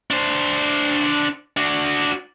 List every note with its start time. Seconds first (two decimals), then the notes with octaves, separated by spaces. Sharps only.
0.11 D4 C5
1.57 D4 F#4